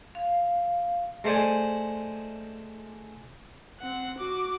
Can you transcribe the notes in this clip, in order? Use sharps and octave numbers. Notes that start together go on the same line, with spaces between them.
F5
G#3 A3 C5 D5 G#5
C4 F#5
F#4 D6